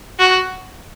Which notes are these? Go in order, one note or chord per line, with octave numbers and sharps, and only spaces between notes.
F#4